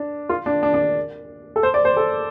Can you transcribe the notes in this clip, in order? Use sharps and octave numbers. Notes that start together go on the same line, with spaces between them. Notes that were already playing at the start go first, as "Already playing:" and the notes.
Already playing: D4
F4
D4
D4
D4
A4
C5
D5
C5
A4